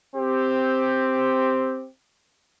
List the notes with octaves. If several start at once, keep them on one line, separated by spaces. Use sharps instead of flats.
C4 G4